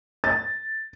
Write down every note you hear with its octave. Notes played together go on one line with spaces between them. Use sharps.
A6